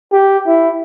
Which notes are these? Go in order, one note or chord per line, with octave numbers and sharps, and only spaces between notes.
G4
E4